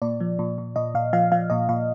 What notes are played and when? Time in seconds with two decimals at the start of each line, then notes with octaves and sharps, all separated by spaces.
0.02 A#2 D5
0.20 F3
0.39 A#2
0.58 A#2
0.76 A#2 D#5
0.94 A#2 F5
1.13 F3 F5
1.32 F3 F5
1.50 A#2 D#5
1.69 A#2 F5